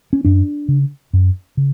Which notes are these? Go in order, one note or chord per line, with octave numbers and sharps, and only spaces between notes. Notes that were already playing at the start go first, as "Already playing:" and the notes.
C#4
F#2 D4
C#3
F#2
C#3